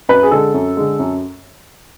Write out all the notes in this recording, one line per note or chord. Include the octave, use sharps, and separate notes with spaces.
F#2 B4
G#4
D3 G#3 A4
F#2
D3 G#3
F#2